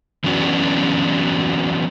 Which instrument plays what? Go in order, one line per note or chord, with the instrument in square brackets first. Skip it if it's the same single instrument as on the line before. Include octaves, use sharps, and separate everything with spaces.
[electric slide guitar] E3 F#3 B3 C#4 D4 F#4